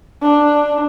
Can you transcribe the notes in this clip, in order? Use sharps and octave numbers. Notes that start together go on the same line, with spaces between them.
D4